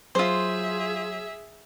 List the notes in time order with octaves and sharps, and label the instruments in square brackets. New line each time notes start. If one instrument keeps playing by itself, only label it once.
[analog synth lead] F#3 [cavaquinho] F4 C5 [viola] G#4 E5